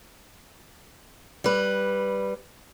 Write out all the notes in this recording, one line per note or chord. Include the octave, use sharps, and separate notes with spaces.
G3 B4